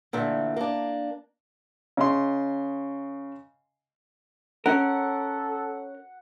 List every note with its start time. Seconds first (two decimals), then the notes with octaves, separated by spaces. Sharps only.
0.13 A#2 D3 E3 A3
0.56 A#3 D4
1.97 C#3 D#5 C6
4.66 C#4 A4 A#4 F#5